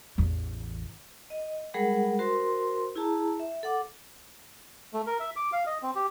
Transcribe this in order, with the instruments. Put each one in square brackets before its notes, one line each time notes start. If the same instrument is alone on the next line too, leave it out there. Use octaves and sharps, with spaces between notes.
[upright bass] A1 E2
[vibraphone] D#5
G3 G#3 G#4 A#4 F#5 B5
F#4 A#4 C5 C6
E4 G#4 A5 A#5
E5
A4 F#5 D6
[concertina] A3
A#4
E5
D6
F5
D#5
C4
G4